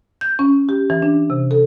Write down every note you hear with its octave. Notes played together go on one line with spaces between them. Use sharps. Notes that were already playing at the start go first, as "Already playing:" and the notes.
G6
C#4
G4
E3
D4
C3
A4